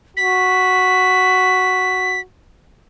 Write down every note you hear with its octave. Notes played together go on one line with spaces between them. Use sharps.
F#4 B6